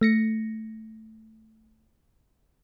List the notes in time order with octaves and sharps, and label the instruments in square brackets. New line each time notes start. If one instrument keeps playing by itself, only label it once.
[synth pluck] A3 A#6 C#7